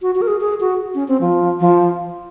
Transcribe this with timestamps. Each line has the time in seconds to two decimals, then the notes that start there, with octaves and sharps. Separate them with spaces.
0.02 F#4
0.15 F#4
0.22 A#4
0.28 G#4
0.41 G#4
0.61 F#4
0.95 C#4
1.08 C4
1.21 F3
1.60 F3